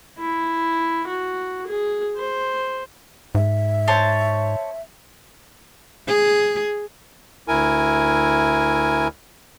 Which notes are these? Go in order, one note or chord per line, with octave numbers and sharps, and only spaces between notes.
E4
F#4
G#4
C5
G#2 E5
C5 C#5 A5
G#4
D2 E4 A#4 G#5